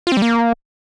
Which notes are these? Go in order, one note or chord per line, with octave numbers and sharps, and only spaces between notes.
F4
C4
G3
A#3